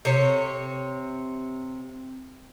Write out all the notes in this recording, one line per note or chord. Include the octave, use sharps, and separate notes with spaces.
C3 C#5